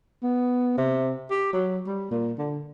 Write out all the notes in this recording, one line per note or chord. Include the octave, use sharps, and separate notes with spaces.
B3
C3
G4
F#3
G3
A#2
D3